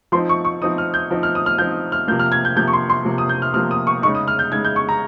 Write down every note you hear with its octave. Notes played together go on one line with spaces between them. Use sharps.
F3 C4 D#4 C6
C#6
C#6
F3 C4 D#4 D#6
F6
G6
F3 C4 D#4
F6
D#6
F6
F3 C4 D#4 G6
F6
C3 F3 A#3 G6
F6
G#6
G6
C3 F3 A#3 G6
C#6
C6
C6
C3 F3 A#3
D#6
G6
F6
C3 F3 A#3 F6
D#6
C#6
C#3 G#3 D#4 C#6
D#6
F6
G6
C#3 G#3 D#4 G#6
G6
C#6
A#5